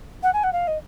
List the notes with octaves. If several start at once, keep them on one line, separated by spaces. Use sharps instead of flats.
F#5
G#5
F#5
F5
D#5